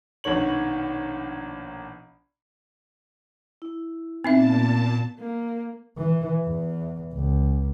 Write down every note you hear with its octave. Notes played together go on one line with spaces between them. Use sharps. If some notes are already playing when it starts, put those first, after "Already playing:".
A#1 B2 D#3 C#5 F#7
E4
A#2 B3 C4 D#4 E5 A5
A#3
E3
E2
C#2